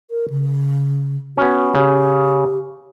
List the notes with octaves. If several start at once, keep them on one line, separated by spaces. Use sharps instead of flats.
A#4
C#3
B3 C#4 F#4
C#3 G4